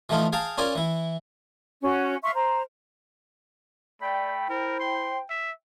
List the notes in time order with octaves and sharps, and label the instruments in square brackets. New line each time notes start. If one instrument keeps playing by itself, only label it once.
[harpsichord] E3 F3 A3 D#4 F4
G#4 F5 G5 A5 A#5
C#4 F4 A#4 D5 G#5
E3 E4
[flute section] C#4 F#4
E5 F5 C6 C#6
C5 A#5
[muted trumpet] A3 [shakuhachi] D5 [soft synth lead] G5 [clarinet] B5
[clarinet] E4 [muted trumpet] A#4 [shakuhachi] C5
[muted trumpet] C6
E5